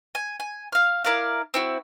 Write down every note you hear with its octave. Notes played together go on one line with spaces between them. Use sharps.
G#5
G#5
F5 F6
E4 A#4 D5 F5
C4 E4 F#4